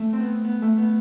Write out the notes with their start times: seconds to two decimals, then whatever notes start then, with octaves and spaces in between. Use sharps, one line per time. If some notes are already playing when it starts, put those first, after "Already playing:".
Already playing: A3
0.13 C4
0.19 B3
0.44 B3
0.62 A3
0.78 B3